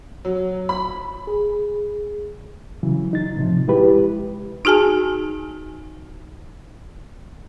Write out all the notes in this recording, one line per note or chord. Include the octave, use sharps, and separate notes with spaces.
F#3
B5
G#4
C#3 E3 F#3
D#4 A6
A2 C3 F3
G#3 E4 G4 B4
D#4 F#4 G#4 G#5 A5